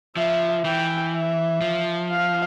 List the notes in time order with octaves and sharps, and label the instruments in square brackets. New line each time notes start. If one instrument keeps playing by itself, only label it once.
[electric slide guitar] F3 [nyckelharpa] E5
[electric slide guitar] E3 [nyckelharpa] G5
[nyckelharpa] E5
[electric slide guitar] F3
[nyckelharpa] F5